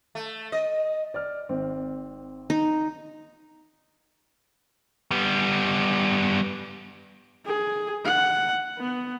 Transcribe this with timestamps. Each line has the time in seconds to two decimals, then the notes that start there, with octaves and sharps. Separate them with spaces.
0.15 A3
0.52 D#5
1.14 D5 F6
1.49 G#1 C4
2.50 D#4
5.11 G3 B3
7.46 G#4
8.04 F#5
8.79 B3